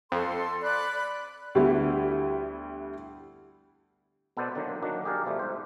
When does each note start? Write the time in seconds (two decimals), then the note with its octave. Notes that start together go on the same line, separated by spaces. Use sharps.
0.12 F2 A4 C6
0.62 D5 B5 F#6
1.55 D2 G3 B3 E4
4.37 B2 B3 A4 B4 C5 D5
4.55 D3 D#3 F#3 A#3
4.83 D#3 F#3 A#3 D4 F#4
5.05 G4 G#4 A#4 D5 F5
5.25 B2 F3 G3 A3
5.39 G#2 C5